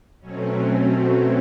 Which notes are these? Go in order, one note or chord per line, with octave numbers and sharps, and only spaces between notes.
B2 F#3 A3 C4 C#4